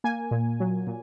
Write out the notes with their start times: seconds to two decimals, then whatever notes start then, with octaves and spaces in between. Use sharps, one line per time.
0.04 A#3 G#5
0.31 A#2
0.60 F#3
0.87 A#2